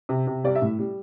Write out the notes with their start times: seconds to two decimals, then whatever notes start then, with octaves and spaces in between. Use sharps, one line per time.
0.09 C3
0.27 C3
0.44 G3 D5
0.55 E5
0.62 A2
0.79 G3